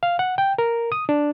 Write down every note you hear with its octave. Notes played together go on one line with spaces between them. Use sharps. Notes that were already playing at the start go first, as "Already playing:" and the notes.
F5
F#5
G5
A#4
D#6
D4